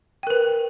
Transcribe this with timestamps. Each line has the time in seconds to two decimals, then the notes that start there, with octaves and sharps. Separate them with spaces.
0.23 G5
0.27 A#4
0.30 B4